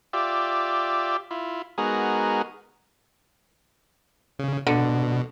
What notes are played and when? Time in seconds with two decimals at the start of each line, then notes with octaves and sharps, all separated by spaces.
0.13 F4 G4 D5 E5
1.31 E4 F4
1.78 G#3 B3 D#4 F#4 G#4 A#4
4.39 C#3
4.67 B2 D3